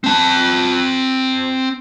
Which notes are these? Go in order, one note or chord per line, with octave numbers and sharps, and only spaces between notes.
C4 A5